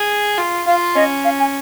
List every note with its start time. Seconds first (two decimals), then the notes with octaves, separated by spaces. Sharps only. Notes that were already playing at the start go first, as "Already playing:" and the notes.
Already playing: G#4
0.38 F4
0.66 F4 F5
0.96 C#4 D#5
1.25 F5
1.39 G#5